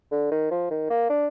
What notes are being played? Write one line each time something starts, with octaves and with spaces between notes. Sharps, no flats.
D3
D#3
F3
D#3
A#3
D4